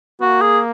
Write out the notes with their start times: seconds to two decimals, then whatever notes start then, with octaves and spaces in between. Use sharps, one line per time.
0.21 A#3 F#4
0.41 G#4